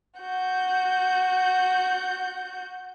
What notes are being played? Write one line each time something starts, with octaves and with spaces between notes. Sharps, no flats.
F#4 G6